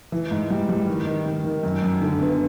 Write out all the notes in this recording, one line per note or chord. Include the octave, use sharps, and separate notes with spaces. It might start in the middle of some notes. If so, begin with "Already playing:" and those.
E3
G#2
G3
G3
D#3
D#3
D#3
D#3
F#2
F#2
D3
B3